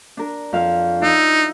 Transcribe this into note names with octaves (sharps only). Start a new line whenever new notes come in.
D4 A#4
F2 F5
D#4 E4